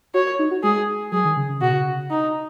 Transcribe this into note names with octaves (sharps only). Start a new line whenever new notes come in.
F#4 C#5
D#4
F#4
G#3 G#4
F#3 G#4
D#3
C#3
C#3
B2 F#4
C#3
D#4